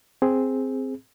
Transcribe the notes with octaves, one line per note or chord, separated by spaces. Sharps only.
C4 G#4